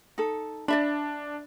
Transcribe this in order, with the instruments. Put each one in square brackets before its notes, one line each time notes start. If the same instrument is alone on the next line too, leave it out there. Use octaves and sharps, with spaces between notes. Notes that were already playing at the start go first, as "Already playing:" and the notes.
[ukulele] D#4 A4
[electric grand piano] D4 [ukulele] D5 E5 B5